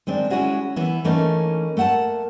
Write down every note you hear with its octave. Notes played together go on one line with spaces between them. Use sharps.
D#3 G#3 C4 D4
G#3 A#3 C#4 E4 F#4 G#4
E3 B3 E4
E3 A3 A#3 C#4 D#4
A3 A#3 F#5 G5 A5